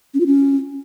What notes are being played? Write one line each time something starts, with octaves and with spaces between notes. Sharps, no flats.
C#4
F4
C#4